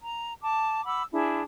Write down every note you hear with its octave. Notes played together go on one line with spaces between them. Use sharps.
A#5
A5 D6
F#5 B5 D6 E6
D4 E4 G#4